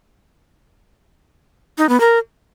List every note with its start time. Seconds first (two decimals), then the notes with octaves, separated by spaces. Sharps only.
1.78 D#4
1.89 B3
2.00 A#4